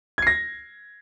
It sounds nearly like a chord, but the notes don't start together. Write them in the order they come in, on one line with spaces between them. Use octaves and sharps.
G#6 C7 A#6